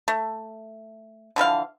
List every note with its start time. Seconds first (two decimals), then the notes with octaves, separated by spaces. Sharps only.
0.08 A3
1.36 D3 E3 F3 F5